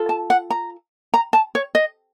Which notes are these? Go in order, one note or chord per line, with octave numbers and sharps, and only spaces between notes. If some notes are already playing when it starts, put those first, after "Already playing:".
Already playing: F4 A4
A5
F#5
A#5
A#5
A5
C#5
D#5